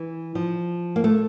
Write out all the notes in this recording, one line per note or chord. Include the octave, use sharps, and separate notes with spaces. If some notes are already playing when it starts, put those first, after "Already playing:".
Already playing: E3
F3
A#3
A3